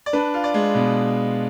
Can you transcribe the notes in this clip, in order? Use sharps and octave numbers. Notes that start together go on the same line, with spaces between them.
D5
D4 B4
F4
D5
G#3
B2